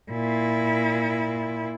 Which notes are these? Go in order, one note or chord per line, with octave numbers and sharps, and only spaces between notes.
A#2 E4